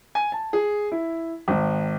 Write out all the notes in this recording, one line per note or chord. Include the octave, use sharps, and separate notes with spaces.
G#5
A5
G#4
E4
G#1